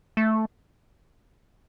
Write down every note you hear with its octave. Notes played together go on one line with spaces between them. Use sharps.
A3